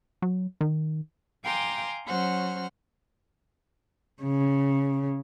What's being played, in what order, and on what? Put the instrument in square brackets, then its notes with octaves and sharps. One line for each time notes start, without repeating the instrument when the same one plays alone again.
[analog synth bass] F#3
D#3
[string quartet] F5 G5 G#5 A#5 C6 D6
F#3 C#4 C5 F#5 F6
C#3